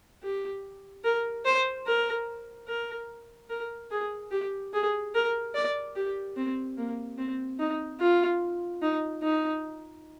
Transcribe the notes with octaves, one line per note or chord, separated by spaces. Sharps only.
G4
A#4
C5
A#4
A#4
A#4
G#4
G4
G#4
A#4
D5
G4
C4
A#3
C4
D#4
F4
D#4
D#4